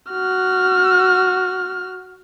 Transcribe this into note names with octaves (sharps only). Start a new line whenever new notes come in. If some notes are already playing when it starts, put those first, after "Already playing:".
F#4 F6